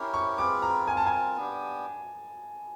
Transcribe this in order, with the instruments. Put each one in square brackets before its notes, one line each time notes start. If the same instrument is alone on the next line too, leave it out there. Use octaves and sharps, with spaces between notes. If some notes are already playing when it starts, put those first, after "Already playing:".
Already playing: [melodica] C#4 E4 G4 A#4
[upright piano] C#6
[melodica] C4 F4 G#4 B4 [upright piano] D6
[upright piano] A#5
[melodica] C4 F4 A#4 [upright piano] G#5
[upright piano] A5
G#5
[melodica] B3 D4 G4